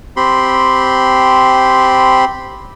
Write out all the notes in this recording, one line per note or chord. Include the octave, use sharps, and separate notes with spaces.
C4 G4 B5 C6